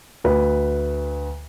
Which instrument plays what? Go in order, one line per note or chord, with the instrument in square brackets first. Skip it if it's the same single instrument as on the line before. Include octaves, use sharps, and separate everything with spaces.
[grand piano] D2 B4